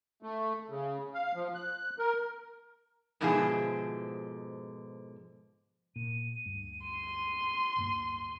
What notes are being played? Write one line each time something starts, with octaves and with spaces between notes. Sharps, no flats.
A3
C#3
F5
F3
F#6
A#4
G#2 B2 D3 F3 E4 G#4
A#2 D#7
D2 G2
C6
D1 G2 A#3